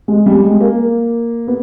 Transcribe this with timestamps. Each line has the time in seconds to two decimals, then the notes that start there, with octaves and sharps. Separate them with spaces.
0.08 G#3
0.26 G3
0.43 G#3
0.61 A#3
1.47 B3